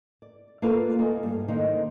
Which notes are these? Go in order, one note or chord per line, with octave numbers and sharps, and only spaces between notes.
D5
A#3 F4 A4 B4 D5 F5
D2 A#3 D#4 A4 G#5
G2
D3 D#3 A#3 D#4 C5